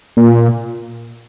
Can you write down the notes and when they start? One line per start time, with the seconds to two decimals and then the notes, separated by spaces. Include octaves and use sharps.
0.17 A#2